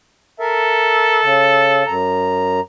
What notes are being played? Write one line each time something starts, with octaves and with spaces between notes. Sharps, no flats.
A4 A#4 E5
C#3
F#2 A#5